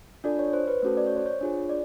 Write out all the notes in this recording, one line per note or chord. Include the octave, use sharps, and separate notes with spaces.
D4 F4 A4 D5
C#5
C5
B4
A3 C#4 F#4 A4 C5
D5
C#5
C5
C#5
D4 F4 G#4
D5